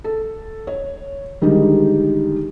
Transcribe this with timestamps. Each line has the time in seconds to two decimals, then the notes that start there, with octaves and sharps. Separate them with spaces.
0.04 A4
0.67 C#5
1.41 D3 D#3 G3 G#3 D#4